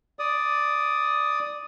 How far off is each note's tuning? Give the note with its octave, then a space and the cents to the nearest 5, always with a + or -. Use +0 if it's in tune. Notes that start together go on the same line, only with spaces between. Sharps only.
D5 +0 D#6 +0